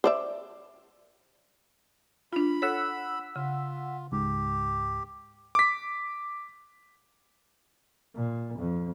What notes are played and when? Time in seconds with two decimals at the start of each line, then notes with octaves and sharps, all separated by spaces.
0.04 C5 D5 E5
2.33 D4 F4 B5
2.62 A4 C#5 F#5 E6 B6
3.36 C#3 F4
4.12 C#2 G#2 G4
5.55 D6 B6
8.15 A#2
8.58 F2